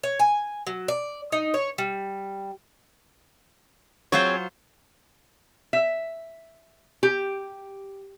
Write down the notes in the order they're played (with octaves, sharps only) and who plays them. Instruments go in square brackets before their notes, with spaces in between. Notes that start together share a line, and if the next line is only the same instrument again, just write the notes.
[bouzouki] C#5
G#5
F#3
D5
D#4
C#5
G3
[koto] F#3 F4 C5 [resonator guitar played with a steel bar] C4 G#4 C#5
[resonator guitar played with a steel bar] E5
G4